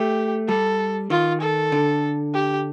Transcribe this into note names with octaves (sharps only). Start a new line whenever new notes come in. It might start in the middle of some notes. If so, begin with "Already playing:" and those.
Already playing: A3 G4
G3 A4
D#3 F4
A4
D3
G4